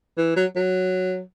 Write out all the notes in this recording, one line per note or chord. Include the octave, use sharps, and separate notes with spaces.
E3
F#3
F#3